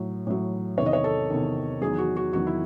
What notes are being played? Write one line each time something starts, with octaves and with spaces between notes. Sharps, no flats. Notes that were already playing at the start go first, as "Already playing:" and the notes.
Already playing: A2 F#3
A2 F#3
E2 C3 D#3 C#5
D#5
C#5
A4
E2 C3 D#3
E2 D#3 F#3 G#4
F#4
F#4
E2 D#3 F#3 F#4
E4